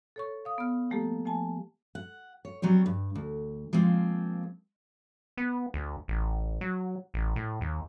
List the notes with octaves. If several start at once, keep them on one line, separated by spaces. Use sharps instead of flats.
A4 C#5 C#6
F5 D#6
B3 F6
F3 G3 A3 A#3 G4 A4
F3 A3 G#5 A5
F#5
C#5
F#3 G3 C4 C#5
G2
D2
F3 G#3 A#3 C4
B3
D2
A1
F#3
A1
A2
D#2